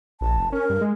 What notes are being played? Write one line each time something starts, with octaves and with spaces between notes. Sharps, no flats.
A#1 A5
F1
C#4 A#4
G2
G#3